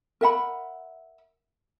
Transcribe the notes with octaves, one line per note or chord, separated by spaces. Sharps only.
A#4 E5 F#5 B5